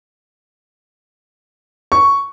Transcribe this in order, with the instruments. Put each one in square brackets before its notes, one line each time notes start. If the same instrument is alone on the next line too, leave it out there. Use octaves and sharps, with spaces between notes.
[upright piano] C#6